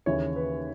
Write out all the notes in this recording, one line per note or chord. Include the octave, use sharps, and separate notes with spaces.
D#2 C#3 E3 C#5
B4